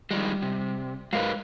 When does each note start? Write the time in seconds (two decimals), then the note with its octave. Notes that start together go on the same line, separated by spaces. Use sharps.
0.11 D#3 F3 G3 G#3
0.42 C3
1.13 G#2 F#3 A#4 B4 F5